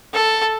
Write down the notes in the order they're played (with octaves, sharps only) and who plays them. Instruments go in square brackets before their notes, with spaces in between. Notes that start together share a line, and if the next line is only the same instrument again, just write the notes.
[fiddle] A4